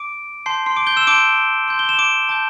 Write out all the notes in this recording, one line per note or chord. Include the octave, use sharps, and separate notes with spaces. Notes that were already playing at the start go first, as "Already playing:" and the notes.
Already playing: D6 D7
A5 C6 G6 C7
C6 C7
D6 D7
G6 G7
E6 E7
A5 C6 D6 G6 D7
C6 G6
G7
E7
D6 D7
A5 D6 G6